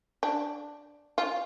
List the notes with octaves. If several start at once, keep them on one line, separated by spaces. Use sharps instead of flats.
D4
F4